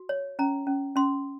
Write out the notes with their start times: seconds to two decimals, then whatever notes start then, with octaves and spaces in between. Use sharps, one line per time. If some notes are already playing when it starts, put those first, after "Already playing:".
Already playing: F#4
0.09 C#5
0.39 C#4 A#5
0.67 C#4
0.96 C#4 C6